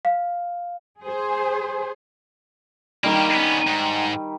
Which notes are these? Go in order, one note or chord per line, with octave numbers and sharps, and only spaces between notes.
F5
G#4 C5
D#3 G3 A#3 G4
B3 C#4
G#2